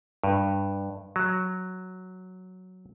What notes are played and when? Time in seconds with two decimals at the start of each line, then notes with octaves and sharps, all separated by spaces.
0.24 G2
1.16 F#3